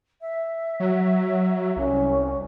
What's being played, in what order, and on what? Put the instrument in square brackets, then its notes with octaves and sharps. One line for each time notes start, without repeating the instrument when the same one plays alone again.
[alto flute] E5
[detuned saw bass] F#3
[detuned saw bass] C2 [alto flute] C#4